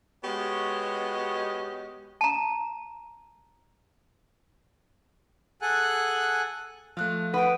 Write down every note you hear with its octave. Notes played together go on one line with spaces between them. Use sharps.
G#3 B3 F#4 G4 C#5 D#5
A5 A#5
G#4 A4 F#5 G#5 F#6
F3 A3 F5 F#6
B4 F#5 G5 D#6